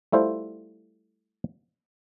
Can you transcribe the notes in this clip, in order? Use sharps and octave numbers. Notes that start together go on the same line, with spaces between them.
G3 A3 E4 F4 C5